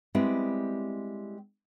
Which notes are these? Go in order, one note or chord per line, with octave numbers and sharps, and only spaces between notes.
G3 G#3 B3 C4 E4 G4